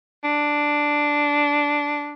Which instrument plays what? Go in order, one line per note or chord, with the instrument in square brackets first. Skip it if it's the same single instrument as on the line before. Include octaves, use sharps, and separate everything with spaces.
[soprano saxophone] D4